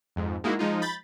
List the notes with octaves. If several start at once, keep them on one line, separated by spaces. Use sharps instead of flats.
F2 G#2
G#3 A#3 D#4 E4 F#4
F3 G#3 D#4 F4
B5 G6 A6